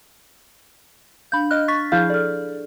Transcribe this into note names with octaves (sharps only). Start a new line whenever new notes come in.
D4 F5 B5 G6
D#5 F6 F#6
C#6 A6 B6
F3 E4 G#4 F5 F6 G6
A4 D5 F6